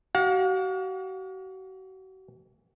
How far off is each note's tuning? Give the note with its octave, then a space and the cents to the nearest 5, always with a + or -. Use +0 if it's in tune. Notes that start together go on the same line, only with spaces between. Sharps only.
F#4 +40 F5 +45